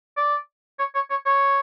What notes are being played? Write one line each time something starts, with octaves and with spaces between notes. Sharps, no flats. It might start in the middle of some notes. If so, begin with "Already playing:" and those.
D5
C#5
C#5
C#5
C#5